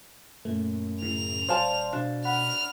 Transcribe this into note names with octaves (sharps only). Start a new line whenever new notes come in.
F#2 A#2 A3
A2 C#3 F7
D#1 C5 D5 F5 A5
B2 D4
F#5 B5 F6